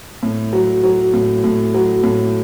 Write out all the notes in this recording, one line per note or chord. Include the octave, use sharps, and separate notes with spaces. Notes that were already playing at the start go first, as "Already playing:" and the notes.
A2
F#3
F#3
A2
A2
F#3
A2